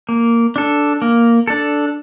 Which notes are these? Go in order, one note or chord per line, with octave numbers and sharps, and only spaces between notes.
A#3
D4 A4
A#3
D4 A4